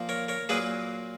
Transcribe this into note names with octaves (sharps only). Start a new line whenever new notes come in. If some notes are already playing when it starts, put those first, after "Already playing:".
Already playing: A#2 F3 A#3
A#4 C#5
A#4 C#5
A#2 F#3 A#3 G#4 B4